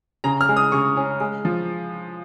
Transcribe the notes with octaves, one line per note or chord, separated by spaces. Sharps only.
C#3 A#5
F6
G#3
D#6
C#3 C#6
C#4
G#3
F3